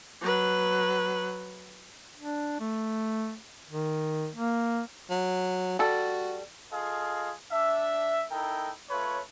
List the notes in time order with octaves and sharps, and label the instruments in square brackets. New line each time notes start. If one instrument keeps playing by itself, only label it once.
[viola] F#3 B4
[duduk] D4
A3
D#3
A#3
[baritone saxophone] F#3
[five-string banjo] G3 A4 [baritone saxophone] F#4
[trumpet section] F4 G#4 A4 D#5 F5
D4 E5
D#4 E4 A4 A#4 G5
A3 F4 B4 C#5